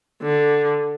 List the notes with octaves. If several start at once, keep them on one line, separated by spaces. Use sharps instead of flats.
D3